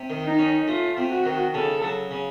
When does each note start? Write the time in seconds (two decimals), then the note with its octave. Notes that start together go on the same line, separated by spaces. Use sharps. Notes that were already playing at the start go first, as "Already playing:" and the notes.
Already playing: C3
0.10 D#3
0.25 D#4
0.39 C#4
0.68 A3 F4
0.97 C3
1.10 F#4
1.26 D#3
1.54 C#3 A4
1.83 F#3
2.11 C#3